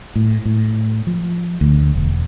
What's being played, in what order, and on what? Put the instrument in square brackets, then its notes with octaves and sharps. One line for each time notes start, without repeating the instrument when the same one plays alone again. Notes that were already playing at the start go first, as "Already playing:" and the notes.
[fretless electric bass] A2
A2
F3
D2
E1